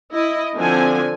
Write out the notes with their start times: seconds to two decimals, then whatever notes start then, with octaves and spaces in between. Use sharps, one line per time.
0.13 E4 D#5
0.57 D3 F3 C4 G#5